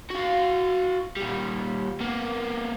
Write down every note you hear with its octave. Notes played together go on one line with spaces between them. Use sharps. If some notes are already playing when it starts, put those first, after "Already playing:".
F#4 F5
A#2 G3
A#3 B3